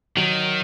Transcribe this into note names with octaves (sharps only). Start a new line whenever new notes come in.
D#3 F#3